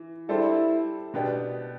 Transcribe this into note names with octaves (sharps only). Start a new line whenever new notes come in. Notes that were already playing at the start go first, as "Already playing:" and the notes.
Already playing: E3
G3 D4 E4 A4 C5
B2 B3 D4 G4